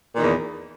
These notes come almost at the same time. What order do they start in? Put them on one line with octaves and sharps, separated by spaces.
A#2 D#3 E2